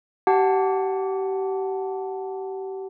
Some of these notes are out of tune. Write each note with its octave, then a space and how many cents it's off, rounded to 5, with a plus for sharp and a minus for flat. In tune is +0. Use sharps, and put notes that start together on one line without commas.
G4 -30 F#5 +0 A5 +0